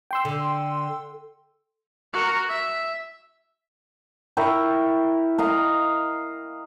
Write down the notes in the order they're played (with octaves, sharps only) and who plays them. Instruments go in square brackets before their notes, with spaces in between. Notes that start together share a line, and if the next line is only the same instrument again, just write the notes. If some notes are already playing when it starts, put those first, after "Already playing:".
[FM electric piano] G5 C6 E6
[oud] D3
[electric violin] F#4 A#4
E5
[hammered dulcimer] E4 A#4 G5 C#6
D#5 F5 A#5